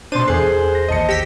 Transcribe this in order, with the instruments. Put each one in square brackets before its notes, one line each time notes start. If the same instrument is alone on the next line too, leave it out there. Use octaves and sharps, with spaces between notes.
[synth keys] B2 A6 D#7 [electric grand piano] D4 C6 [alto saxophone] C5 [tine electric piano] D5
[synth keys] E2 F#6 [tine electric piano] G#4 A4 [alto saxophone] C5 [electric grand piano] G#5 C7
[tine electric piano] A#6
[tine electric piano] A1 D#2 [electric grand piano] D#5 A5 C#7
[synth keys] G4 E6 B6 [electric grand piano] A#6